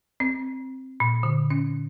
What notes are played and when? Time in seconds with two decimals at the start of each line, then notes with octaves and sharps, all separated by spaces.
0.20 C4
1.00 A#2
1.23 D3
1.50 C#4